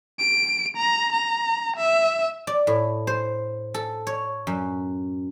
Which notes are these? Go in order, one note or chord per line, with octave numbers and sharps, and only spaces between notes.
D7
A#5
A#5
E5
D5
A2
C5
A4
C#5
F#2